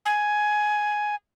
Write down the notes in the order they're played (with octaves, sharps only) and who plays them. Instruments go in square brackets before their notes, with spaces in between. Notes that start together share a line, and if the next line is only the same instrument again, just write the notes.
[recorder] G#5